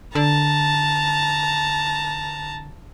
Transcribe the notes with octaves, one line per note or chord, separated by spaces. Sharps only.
D3 A5 A#5